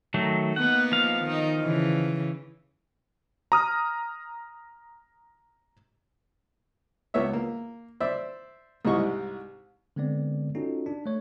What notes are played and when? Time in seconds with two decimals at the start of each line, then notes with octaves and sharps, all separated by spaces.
0.14 D#3 F#3 A3
0.56 A#3 B3 D#4 F#5
0.92 F3 F5
1.23 D#3 D#4
1.61 C#3 E3
3.52 A#5 D#6 F6
7.14 C#2 B3 C#5 E5
7.33 A#3
8.00 C5 D5 E5
8.85 C2 G#2 C3 E4 D#5 C#6
9.96 D3 G#3 B3 C4 D5
10.55 C#4 D#4 F4 F#4 A4
10.86 D4
11.06 A3 C#5